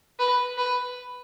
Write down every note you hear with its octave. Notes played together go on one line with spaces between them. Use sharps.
B4
B4